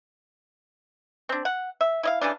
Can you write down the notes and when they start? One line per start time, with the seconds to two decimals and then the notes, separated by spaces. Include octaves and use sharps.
1.29 C4 D4
1.45 F#5
1.81 E5
2.03 E4 D#5 F5
2.21 C#3 E3 G3 D4